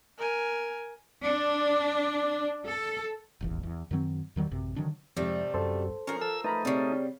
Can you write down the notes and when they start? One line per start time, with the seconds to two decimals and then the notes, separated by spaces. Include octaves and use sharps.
0.18 A#4 G#5
1.22 D4
2.65 A4
3.41 D#1 A1 E2
3.63 E2
3.91 F#2 D#3 F#3 C4
4.36 E2 D#3 F#3 G3
4.51 A1 F#2 C3
4.76 D3 D#3 F#3 D4
5.17 F2 G#2 C3 G3 A3
5.54 F#2 A4 C5
6.07 F3 C#4 A#4
6.21 A4 E6
6.44 A3 D#4 B4 A#5 B5
6.65 C#3 G3 C4